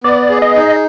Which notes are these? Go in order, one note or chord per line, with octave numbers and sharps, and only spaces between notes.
B3 D5
G#4
D#5
D#4